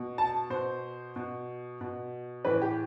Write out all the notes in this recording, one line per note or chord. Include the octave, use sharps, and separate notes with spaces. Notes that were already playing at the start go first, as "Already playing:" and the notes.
Already playing: B2
A5
B2 C5
B2
B2
A2 E3 B4
G4